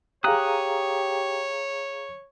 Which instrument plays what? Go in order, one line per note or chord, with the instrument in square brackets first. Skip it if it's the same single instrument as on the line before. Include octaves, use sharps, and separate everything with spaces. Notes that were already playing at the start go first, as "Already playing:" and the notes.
[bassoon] G4 [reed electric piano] G#4 F5 A#5 [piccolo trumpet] C#5 [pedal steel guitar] D#6 F#6